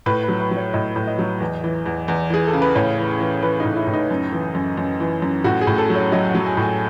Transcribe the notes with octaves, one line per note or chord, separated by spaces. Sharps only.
A2 B4
B4
F#3
B4
F#3
C#5
A2 D#5
A2
D#5
F#3
E2
E3
E2
E2
E3 G#4
A4
C#3
B4
A2 C#5
E3
E3
E3 B4
D#4
A2
E4
A2
D#4
F#2
E3
F#2
F#2
E3
F#2
A2 F#4
G#4
A2
A4
F#3
C#5
F#3 D#5
F#5
F#3
G#5
A2
G#5